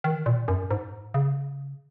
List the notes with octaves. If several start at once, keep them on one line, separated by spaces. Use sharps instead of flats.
D#3
A#2
F#2
G#2
C#3